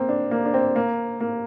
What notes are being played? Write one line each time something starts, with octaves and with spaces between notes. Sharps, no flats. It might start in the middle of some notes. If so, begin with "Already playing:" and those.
Already playing: A#3 C4
D4
A#3
D4
C4
A#3
A#3